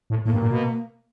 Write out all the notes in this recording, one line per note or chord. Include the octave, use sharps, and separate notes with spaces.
A2
A2 A#3
G2
A#2
B2